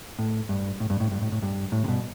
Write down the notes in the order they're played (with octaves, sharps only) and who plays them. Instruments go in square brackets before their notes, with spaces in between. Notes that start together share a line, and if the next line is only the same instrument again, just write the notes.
[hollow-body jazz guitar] A2
G2
A2
G2
A2
G2
A2
A2
G2
A2
C3
G2 B2